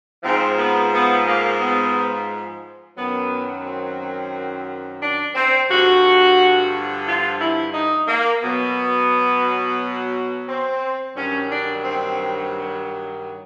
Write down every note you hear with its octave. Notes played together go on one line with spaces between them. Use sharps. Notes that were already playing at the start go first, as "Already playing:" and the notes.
G#2 F3 C4
B3
B3
A#3
B3
F#2 D#3 F#3 B3
C4
D4
C4
G2 D3 F3 F#4
F4
E4
D#4
A#3
B2 F#3 B3
C4
G2 D#3 F#3 C#4
D4
C4